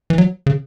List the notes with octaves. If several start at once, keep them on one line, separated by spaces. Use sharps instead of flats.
E3
F#3
C#3